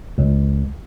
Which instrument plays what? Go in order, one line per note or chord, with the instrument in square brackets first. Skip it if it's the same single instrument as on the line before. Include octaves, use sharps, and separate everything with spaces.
[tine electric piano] C#2